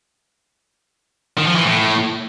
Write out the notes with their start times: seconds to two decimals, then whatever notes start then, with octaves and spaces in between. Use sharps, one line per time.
1.38 D#3
1.47 F3
1.56 E3
1.65 A2